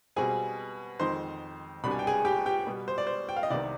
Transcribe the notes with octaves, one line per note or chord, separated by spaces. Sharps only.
B2 G3 C4 G#4 G#5
F2 D#3 G#3 C4 D#4 C5 C6
C2 B2 G3 D4 B5
G#5
G5
G#4 G#5
G4 G5
G4 G5
B2 G3 B3
C5
D5
C5
G5
F5
D#5
C2 C3 D#3 B3 D5